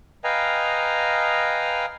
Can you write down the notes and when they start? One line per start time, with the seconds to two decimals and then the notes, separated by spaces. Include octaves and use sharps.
0.24 B4 D#5 F5 G5 G#5 A#5